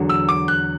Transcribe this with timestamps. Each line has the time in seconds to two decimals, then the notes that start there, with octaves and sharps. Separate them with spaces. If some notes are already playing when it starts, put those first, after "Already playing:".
Already playing: E2 D3 F#3
0.09 E6
0.29 D6
0.48 F#6